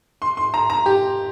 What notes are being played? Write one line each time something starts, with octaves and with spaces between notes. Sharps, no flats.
C6
C6
A#5
A#5
G4